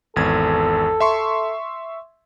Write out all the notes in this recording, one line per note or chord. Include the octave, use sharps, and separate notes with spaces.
G#1 E2 A4 G#6
E5 C6 C#6